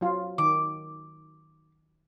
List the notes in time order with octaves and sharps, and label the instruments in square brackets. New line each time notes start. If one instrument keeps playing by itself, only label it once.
[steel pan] F#3 F4
[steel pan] D#3 [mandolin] D6